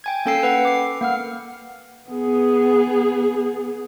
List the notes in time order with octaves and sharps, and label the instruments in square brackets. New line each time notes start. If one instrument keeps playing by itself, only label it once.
[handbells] G5 G#5 G#6
A#3 C#4 A4 G5 E6 C7
B4 F#5 C7
D6 C7
A#3 F#5 F6
[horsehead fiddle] B3 G#4